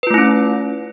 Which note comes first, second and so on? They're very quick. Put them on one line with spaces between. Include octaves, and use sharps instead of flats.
B4 F4 A3 E4 C#4